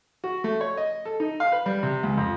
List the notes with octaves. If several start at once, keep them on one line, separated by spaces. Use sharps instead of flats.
F#4
A3
C#5
D#5
A4
D#4
F5
B4
G3
C3
C#2
F2